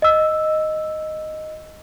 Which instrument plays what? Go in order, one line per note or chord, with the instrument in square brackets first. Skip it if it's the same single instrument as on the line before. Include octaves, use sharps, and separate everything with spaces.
[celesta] D#5 E6